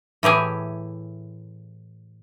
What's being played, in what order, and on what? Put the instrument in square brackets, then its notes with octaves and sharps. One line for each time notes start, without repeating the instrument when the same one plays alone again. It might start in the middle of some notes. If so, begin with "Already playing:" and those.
[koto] A2 E3 G4 G#4